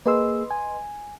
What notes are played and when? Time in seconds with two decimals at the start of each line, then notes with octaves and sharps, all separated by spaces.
0.06 A#3 G#4 B4 D#5 C6 E6
0.51 G#5